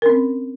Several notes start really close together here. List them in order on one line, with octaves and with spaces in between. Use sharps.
A#4 C#4 C4